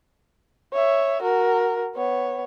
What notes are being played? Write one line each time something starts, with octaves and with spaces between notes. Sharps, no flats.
C#5 E5
F#4 A#4
B3 C#5